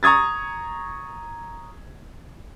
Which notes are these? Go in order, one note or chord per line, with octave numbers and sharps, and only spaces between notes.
A#5 C#6 D#6 G#6 A6